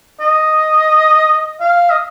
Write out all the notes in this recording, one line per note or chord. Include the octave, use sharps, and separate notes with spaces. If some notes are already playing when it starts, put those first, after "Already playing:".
D#5
F5
D#5